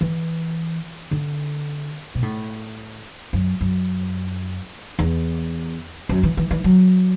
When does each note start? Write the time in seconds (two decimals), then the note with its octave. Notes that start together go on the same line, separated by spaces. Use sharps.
0.01 E3
1.11 D3
2.15 B2
2.22 A2
3.33 F#2
3.61 F#2
4.99 E2
6.09 F#2
6.23 E3
6.37 E3
6.51 E3
6.64 F#3